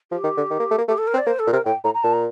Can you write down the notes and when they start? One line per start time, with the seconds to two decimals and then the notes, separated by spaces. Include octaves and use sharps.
0.11 F3 G4
0.24 D#3
0.37 D3
0.50 D#3
0.59 A#3
0.71 A3
0.78 A#3
0.88 A3 G4
0.98 A4
1.07 A#4
1.14 C4
1.17 D5
1.26 A#3 C5
1.39 A4
1.47 A#2
1.52 C3 A#4
1.65 A2 G5
1.84 A2 A#5
1.94 A#5
2.03 A#2 A5
2.13 A#5